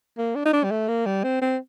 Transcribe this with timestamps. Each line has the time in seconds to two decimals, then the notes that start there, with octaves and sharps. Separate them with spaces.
0.18 A#3
0.35 D4
0.45 D#4
0.53 D4
0.64 G3
0.71 A3
0.88 A#3
1.06 G3
1.23 C4
1.41 C4